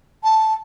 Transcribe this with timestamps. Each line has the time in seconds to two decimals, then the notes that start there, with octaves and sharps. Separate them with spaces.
0.24 A5